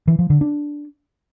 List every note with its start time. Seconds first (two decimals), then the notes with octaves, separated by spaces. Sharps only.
0.08 E3
0.19 F3
0.30 D3
0.41 D4